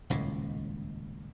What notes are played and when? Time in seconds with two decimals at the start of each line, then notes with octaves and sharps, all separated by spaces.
0.10 D#1 C#2 A2 G#3